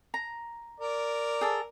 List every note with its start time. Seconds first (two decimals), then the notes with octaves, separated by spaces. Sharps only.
0.14 A#5
0.80 A#4 D5
1.41 G#4 A4